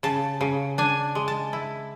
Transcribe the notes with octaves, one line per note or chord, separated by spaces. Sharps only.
C#3 A5
C#3
D4 G#5
G#3
A5
E4